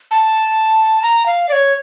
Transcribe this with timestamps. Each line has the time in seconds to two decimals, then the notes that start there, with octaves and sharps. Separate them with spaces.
0.11 A5
1.02 A#5
1.26 F5
1.49 D5
1.53 C#5